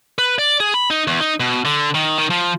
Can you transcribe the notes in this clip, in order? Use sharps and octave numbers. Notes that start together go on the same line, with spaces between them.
B4
D5
G#4
B5
D#4
E2
D#4
B2
D3
D#3
D#3
F3